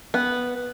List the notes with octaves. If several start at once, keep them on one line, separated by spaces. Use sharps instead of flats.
B3